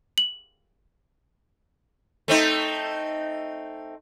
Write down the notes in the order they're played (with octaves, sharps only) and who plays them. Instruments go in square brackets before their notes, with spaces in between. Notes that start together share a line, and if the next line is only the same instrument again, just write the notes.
[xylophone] F#7
[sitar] A3 C4 D#4